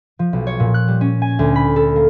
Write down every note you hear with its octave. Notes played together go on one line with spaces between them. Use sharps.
F3
B1
C#5
A#2
F#6
G3
C#4
G#5
D2
B5
A4
A#3